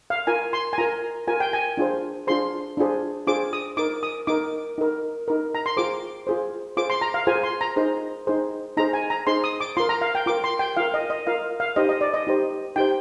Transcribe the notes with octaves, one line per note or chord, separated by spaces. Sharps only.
F5
F4 A#4 G#5
C6
G#5
F4 A#4 A#5
F4 A#4 G#5
G5
G#5
D4 F4 G#4 C5
D4 F4 G#4 C5 C6
D4 F4 G#4 C5
D4 F4 G#4 C5 D6
D#6
D#4 A#4 D6
D#6
D#4 A#4 D6
D#4 A#4
D#4 A#4
A#5
C6
F4 G#4 C5 D6
F4 G#4 C5
F4 G#4 C5 D6
C6
A#5
F5
F4 G#4 C5 G#5
C6
A#5
D#4 G#4 C5
D#4 G#4 C5
D#4 G#4 C5 A#5
G#5
A#5
D#4 G#4 C5 C6
D#6
D6
F4 A#4 C6
A#5
F5
G5
F4 A#4 D6
C6
G5
F4 A#4 F5
D#5
D#5
F4 A#4 F5
F5
D#4 G4 C5 D#5
D#5
D5
D#5
D#4 G4 C5
D#4 G4 C5 G5